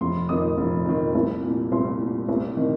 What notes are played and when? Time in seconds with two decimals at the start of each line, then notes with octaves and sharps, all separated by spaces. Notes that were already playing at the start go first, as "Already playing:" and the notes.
0.01 F1 C6
0.29 F2 D#3 D#6
0.58 F1
0.85 F2 D#3
1.15 C2
1.43 A#2
1.72 C2 C6
1.99 A#2
2.28 C2
2.57 C3 D#3